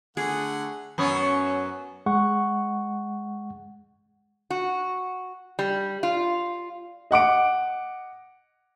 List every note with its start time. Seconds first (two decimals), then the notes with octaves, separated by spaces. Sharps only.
0.17 D3 A3 G#4 F#5
0.98 F#2 B3 C#5
2.06 G#3 F#5 C#6
4.50 F#4
5.59 G3
6.03 F4
7.11 D#5 F#5 D6 D7